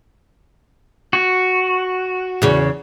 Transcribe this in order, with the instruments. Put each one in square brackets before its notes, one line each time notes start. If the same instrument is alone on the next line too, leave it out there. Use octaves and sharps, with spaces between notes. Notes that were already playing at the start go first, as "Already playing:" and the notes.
[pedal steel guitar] F#4
[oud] E2 C#3